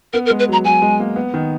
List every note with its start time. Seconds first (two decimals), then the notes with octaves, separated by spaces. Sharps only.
0.13 B3 A#4
0.26 A#4
0.30 G#3
0.39 B4
0.48 F#3 A#5
0.65 F#3 G#5
0.82 G#3
1.00 A#3
1.16 B3
1.34 D#3